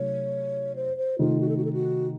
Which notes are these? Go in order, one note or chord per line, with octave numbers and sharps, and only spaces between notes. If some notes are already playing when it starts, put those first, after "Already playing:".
Already playing: C3 F#3 A3 D#4 C#5
C5
C5
C3 D#3 A3 D#4 F4
F#4
A4
F#4
A4
F#4